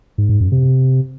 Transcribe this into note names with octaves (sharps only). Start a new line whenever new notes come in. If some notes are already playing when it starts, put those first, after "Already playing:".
G#2
G#2
F#2
C3